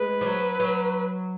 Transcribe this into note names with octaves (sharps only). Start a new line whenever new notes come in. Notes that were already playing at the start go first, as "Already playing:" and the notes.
Already playing: G#3 B4
F3
F#3
F#3